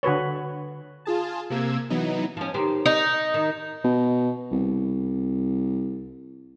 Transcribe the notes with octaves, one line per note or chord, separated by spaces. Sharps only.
D3 F#4 B4 C#5
F4 G#4 A5
C3 A#3 E6 G#6
E3 F#3 B3 D#4
F3 C#4
D#3 G4 C5
D#4
D#3
B2
C2